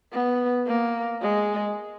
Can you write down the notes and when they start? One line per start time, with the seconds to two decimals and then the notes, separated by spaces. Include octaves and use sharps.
0.12 B3
0.67 A#3
1.22 G#3